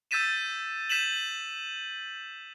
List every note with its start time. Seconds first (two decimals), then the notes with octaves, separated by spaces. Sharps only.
0.11 E6 G6 A6 B6 D#7 E7
0.90 G6 B6 D#7 E7 F#7